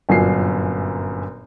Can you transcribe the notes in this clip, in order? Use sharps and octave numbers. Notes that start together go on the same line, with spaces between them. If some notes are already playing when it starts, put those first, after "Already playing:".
G1 F#2 A#2 G#5 C7